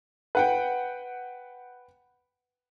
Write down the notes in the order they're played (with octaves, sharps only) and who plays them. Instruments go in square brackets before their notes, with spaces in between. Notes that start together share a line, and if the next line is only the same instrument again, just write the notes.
[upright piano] B4 F#5 G5